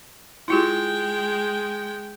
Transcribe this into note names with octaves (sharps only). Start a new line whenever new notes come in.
G#3 E4 F4 G4 G5